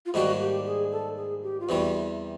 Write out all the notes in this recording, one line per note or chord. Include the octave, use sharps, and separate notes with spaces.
F4
G#2 D#3 G3 A#3 D4 F#4
G4
G#4
A4
G#4
G4
F4
E2 C3 E3 G3 F#4